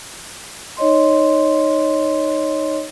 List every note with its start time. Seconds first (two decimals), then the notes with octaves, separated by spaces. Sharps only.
0.77 D#4 C#5 D#5 C6